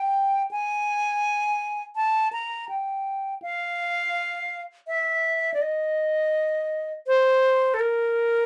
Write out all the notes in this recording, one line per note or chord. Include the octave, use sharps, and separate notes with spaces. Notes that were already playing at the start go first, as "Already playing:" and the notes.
Already playing: G5
G#5
A5
A#5
G5
F5
E5
D5
D#5
C5
A4
A#4